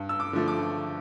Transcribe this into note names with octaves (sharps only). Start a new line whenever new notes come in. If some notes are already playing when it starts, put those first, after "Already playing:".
Already playing: G2
E6
D6
D3 F3 A3
D6